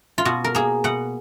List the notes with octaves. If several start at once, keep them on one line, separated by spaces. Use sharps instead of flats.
F4
B2 F#4
A#4
A#3 G#4
B2 F#5